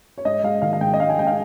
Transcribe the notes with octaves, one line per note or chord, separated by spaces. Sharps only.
C#5
G#2 D#5
G#3 F5
D#3 F5
F5
G#2 G5
D#5
G#2 F5
G#5
G#3 G5
F5